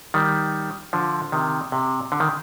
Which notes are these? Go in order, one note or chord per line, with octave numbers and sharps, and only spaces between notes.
D#3 G3
D3 F3
C3 D#3
C3
D3
D#3